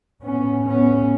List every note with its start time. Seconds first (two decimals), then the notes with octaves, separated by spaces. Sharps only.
0.22 A2 B3 C#4
0.65 B3 C#4